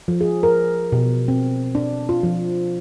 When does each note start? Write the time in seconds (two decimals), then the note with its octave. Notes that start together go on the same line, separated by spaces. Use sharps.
0.08 F3
0.21 G#4
0.43 A#4
0.92 B2
1.28 C4
1.75 D4
2.09 F4
2.23 F3